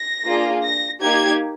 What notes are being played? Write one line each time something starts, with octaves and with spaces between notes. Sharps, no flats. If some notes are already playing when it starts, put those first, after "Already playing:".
Already playing: A#6
A#3 D4 F4 G#4
A#6
A#3 D#4 G4 G#6